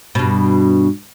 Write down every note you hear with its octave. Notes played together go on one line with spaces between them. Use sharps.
G2 B2